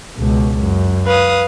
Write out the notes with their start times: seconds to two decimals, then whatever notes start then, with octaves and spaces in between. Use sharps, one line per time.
0.17 C#2 B2
0.62 F#2
1.06 B4 F5 D#6